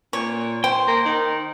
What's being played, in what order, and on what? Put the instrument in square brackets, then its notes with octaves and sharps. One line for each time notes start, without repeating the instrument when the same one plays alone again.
[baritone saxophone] A#2 [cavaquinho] C#5
[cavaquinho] C5 [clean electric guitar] G5
[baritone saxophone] A#3
D#3